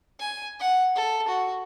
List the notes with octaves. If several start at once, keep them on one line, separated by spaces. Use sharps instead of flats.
G#5
F#5
A4
F#4